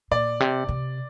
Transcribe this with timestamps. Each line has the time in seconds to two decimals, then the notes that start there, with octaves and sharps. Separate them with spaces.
0.11 A#2 D5
0.40 C3
0.69 C3